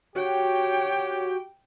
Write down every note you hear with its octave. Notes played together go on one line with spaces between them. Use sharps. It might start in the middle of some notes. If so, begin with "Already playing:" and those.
F#4 G4 C#5 G5